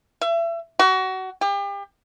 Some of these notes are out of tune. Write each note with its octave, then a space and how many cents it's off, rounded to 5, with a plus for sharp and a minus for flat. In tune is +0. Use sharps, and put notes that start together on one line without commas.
E5 +30
F#4 +25
G4 +35